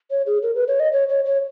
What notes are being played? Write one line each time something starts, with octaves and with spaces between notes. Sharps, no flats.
C#5
G#4
A#4
B4
C#5
D#5
C#5
C#5
C#5